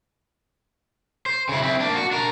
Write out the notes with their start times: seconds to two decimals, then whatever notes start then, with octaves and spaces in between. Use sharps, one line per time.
1.26 C5
1.49 C#3 E4
1.63 C4 E4
1.80 A#3 D4
1.96 F#4
2.11 D4 A#4